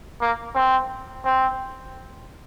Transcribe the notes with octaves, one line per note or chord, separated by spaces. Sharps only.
A#3
C4
C4